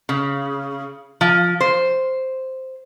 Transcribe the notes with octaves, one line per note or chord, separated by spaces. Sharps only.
C#3
F3
C5